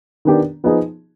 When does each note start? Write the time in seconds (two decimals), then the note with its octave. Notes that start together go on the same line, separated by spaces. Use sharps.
0.25 D#3 B3 D4 G4
0.64 F3 B3 D#4 G#4